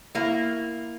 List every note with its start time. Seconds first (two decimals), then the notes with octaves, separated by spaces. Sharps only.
0.15 A#3 E4